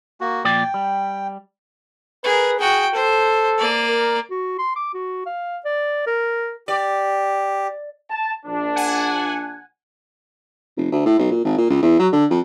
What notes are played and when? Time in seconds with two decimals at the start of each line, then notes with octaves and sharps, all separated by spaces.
0.21 A#3 F#4
0.45 A#2 F3 D5 G5
0.74 G3
2.24 G#4 A#4 B4
2.59 F#4 G#4 G5
2.95 A4 C5
3.58 A#3 D5
3.89 A#4
4.31 F#4
4.59 C6
4.76 D6
4.94 F#4
5.26 F5
5.65 D5
6.07 A#4
6.68 G4 D5
8.10 A5
8.45 A#1 D4
8.76 F#5 G#5
10.77 F1
10.92 D2
11.06 A2
11.19 B1
11.31 A#2
11.45 G#1
11.58 A#2
11.70 C#2
11.83 E2
11.99 F#3
12.13 D3
12.30 F2